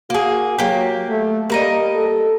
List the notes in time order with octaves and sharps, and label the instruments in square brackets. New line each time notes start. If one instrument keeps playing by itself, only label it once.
[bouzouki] A#3 G#4 [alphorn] F#4
[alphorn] F#3 [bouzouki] A#3 G4
[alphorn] A3
[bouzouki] G3 A#4 D#5 [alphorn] A#3
[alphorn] A4